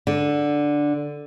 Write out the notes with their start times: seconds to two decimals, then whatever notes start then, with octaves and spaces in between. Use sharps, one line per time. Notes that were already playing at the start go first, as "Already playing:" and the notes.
0.07 D3